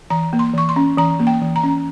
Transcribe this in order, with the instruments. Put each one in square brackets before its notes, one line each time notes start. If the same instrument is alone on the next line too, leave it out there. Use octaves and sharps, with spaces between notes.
[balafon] E3 A#5
A#3
C6
E3 C#6
C6
C#4
E3 A#5
A#3
G5
E3
A#5
C#4